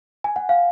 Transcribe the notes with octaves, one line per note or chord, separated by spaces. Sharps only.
G#5
F#5
F5